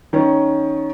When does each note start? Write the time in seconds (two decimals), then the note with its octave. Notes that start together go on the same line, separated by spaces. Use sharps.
0.13 D#3 C#4